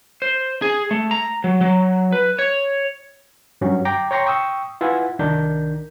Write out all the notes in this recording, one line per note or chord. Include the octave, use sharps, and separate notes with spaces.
C5
G#4
A3
A#5
F#3
F#3
B4
C#5
G2 F#3 C#4
G5 A#5 D6
C#5 G5 A#5 C6 C#6
G5 C#6 D#6 E6
E4 F4 B4 E5 F#5 G#5
C2 D#3 D4 A#4 G6